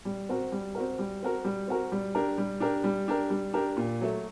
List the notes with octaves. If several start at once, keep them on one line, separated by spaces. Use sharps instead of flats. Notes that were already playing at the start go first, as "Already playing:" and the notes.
G3
C4 F#4 A#4
G3
C4 F#4 A#4
G3
C4 F#4 A#4
G3
C4 F#4 A#4
G3
D4 G4 A#4
G3
D4 G4 A#4
G3
D4 G4 A#4
G3
D4 G4 A#4
A#2
F#3 A3